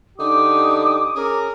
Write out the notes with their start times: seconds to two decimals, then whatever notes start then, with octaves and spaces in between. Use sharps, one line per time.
0.18 D3 D#4 G4 D6 D#6
1.15 C#4 G#4 A#4